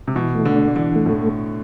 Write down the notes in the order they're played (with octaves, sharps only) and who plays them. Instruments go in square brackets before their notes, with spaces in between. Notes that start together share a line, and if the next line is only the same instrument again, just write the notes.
[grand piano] C3
[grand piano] B2 [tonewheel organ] E3
[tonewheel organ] A3
[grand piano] D3
[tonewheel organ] D4
[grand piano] D3 [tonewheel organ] E3
[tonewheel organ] A3
[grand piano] A2